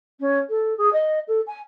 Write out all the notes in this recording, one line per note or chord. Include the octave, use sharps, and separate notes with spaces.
C#4
A4
G#4
D#5
A4
G#5